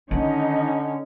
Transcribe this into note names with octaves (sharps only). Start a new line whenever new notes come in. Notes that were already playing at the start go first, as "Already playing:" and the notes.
D3 D#3 C#4 D#4